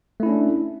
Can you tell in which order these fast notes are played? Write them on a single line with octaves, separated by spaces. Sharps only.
A3 E4 C#4 D4